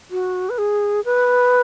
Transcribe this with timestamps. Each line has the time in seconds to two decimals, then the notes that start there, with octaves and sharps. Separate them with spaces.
0.11 F#4
0.50 B4
0.58 G#4
1.05 B4